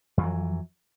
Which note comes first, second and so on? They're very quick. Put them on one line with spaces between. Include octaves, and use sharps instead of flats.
F2 E3 F#3